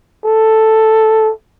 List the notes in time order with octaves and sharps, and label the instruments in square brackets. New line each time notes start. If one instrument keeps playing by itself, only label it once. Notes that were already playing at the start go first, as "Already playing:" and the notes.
[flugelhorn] A4